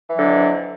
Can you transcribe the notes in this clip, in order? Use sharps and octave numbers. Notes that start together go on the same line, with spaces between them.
F2 D3 E3 F#3